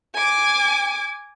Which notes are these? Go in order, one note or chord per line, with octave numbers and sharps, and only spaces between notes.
G#5 D6